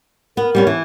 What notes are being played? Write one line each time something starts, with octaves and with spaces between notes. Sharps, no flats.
B3 A#4
G3 B3 C#4
E3